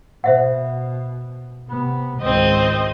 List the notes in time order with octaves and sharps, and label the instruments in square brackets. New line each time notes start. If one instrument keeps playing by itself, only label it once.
[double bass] B2 [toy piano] C5 E5 F#5
[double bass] C3 B3
[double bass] G#1 C#2 [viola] C4 D#5